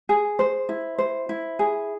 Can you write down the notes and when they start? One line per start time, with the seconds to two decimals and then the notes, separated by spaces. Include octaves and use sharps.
0.09 G#4
0.39 C5
0.69 E4
0.98 C5
1.29 E4
1.59 G#4